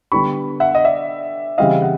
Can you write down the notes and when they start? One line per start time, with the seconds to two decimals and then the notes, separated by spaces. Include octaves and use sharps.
0.12 D3 G3 B3 D4 G4 B5 C#6
0.60 E5 F#5
0.75 D#5
0.84 D5 E5
1.58 C#3 E3 G3 C4 D#5 F5
1.82 F#5